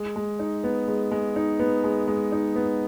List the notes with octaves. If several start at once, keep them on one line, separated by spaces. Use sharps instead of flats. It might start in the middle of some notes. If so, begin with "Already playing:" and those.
Already playing: G#3
G#3
D#4
B3
G#3
G#3
D#4
B3
G#3
G#3
D#4
B3